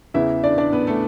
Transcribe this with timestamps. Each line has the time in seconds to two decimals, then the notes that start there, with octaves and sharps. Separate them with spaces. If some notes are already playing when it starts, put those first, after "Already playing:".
0.14 E2 C#3 E3 E4 E5
0.44 D4 D5
0.58 D4 D5
0.72 B3 B4
0.87 A3 A4